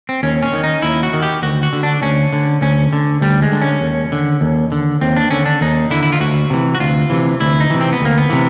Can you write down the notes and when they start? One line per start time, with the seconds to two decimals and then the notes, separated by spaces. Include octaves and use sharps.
0.09 C4
0.23 D#2 C#4
0.43 C#4
0.53 D#3
0.64 D#4
0.82 D#2 E4
1.03 F#4
1.13 D#3
1.23 G4
1.43 D2 F#4
1.63 F#4
1.73 D3
1.83 D4
2.02 D2 C#4
2.33 D3
2.62 D2 C#4
2.93 D3
3.21 D2 G3
3.42 G#3
3.52 D3
3.62 C#4
3.81 D#2
4.12 D3
4.41 D#2
4.72 D3
5.01 D#2 C4
5.16 D4
5.31 D3 C#4
5.46 D4
5.61 D#2 D#4
5.91 D3 E4
6.03 E4
6.12 F4
6.20 D2 F#4
6.50 C3 E3
6.75 F#4
6.80 D2 F4
7.10 C3 E3
7.40 D2 E4
7.60 D#4
7.70 C3 E3
7.81 C4
7.93 B3
8.01 D2 A#3
8.18 B3
8.30 C3 E3